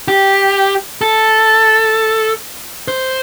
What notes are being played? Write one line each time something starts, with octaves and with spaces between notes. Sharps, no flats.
G4
A4
C5